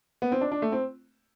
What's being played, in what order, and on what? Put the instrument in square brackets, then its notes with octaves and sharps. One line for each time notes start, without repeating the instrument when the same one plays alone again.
[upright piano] B3
C4
D4
D4
A3
C4